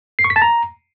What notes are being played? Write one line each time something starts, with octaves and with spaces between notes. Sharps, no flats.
C7
C#6
B6
A5
A#5